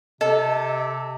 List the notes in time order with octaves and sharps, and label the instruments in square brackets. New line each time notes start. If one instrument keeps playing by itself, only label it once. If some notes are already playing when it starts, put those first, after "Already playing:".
[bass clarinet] C3 [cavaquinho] A4 [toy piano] D#5